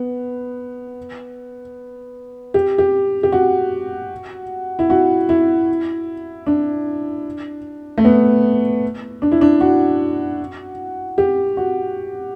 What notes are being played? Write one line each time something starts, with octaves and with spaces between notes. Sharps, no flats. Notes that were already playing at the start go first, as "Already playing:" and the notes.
Already playing: B3
G4
G4
G4
F#4
E4
F#4
E4
D4
A3
B3
D4
E4
D4
F#4
G4
F#4